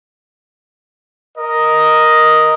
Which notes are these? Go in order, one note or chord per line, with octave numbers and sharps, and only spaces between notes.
A#4 D#5